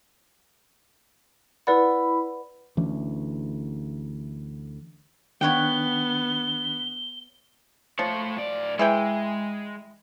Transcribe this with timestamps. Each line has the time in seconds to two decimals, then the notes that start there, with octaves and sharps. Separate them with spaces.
1.67 E4 B4 D5 F#5 B5
2.77 D2 E3 C#4
5.41 D#3 B3 D4 C#5 F#5 G5 G7
7.99 F3 A3 C#5
8.36 A2 D5
8.79 E3 G#3 E4 G5